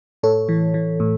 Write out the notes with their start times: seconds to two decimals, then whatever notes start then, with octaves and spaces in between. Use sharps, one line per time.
0.23 A2 A4 C#5
0.49 E3
0.74 E3
1.00 A2